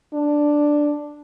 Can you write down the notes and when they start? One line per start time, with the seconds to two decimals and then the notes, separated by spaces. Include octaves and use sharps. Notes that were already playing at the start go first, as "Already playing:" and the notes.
0.14 D4